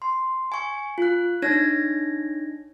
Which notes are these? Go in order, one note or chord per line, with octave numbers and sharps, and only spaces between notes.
C6
G#5 C#6
F4 F#6
D4 D#4 C#5 G#6 A#6